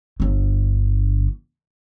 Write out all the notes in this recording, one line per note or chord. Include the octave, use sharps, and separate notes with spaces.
G1 D3